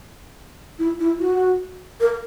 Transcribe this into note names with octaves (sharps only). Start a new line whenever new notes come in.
E4
E4
F#4
A#4